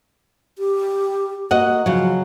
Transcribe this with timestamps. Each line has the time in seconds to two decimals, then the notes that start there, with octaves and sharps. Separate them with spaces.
0.58 G4
1.51 A#3 F#4 D#5 F#5
1.86 C#3 F3 F#3